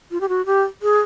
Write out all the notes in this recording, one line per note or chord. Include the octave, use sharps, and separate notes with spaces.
F4
G4
F#4
G4
G#4